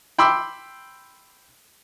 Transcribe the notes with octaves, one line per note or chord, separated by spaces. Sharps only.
G5 B5 C6 D6 E6